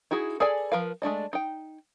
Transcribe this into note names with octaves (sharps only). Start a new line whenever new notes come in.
D#4 E4 F#4 G#4
G#4 A4 B4 D5 G#5
F3 A#4 B4 F5
G#3 A3 D4 D#5
D#4 G5